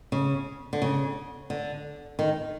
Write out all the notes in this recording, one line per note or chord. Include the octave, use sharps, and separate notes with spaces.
C#3
D3
C#3
D3
D#3